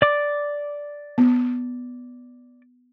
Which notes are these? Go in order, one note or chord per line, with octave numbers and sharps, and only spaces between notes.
D5 D6
B3